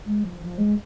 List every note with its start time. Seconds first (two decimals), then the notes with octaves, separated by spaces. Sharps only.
0.06 G#3
0.24 F3
0.41 F3
0.58 G#3